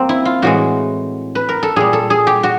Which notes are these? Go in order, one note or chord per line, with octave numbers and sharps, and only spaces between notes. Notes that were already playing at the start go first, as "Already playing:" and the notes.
Already playing: F#2 A#3 C4
E4
F4
A2 E3 G#3 F#4
B4
A#4
A4
A#2 G3 G#4
A4
G#4
G4
F#4